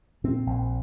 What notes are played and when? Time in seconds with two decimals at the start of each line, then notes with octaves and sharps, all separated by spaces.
0.24 A#2 C4
0.47 A#1